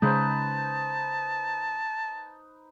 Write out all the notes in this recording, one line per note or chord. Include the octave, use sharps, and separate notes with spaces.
C#3 G#3 D#4 B4 C5 A5